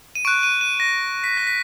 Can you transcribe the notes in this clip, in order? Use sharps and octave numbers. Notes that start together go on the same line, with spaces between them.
D#7
C#6 F#6 D7
D#7
D#7
A#6
B6
A#6
B6